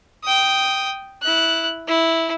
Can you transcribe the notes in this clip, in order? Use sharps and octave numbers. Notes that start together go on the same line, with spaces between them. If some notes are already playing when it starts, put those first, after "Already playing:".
G5 D#6
E4 F#6
E4